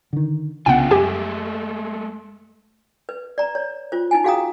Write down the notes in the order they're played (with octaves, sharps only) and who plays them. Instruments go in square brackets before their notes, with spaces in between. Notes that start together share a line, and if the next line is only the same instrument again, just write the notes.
[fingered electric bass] D3 D#3
[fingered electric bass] C2 C#3 B3 [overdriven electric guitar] D4 F4 [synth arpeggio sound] F#5 G5
[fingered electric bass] F#2 [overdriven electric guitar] G#3 A3 [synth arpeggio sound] G4 G#5
[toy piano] B4
D5 A#5
C#5
F4 C5
D#4 E4 G#5
F#4 G#4 F5 G5 A#5 D#6